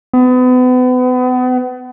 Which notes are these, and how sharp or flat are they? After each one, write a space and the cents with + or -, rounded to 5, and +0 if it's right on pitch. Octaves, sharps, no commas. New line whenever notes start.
B3 +35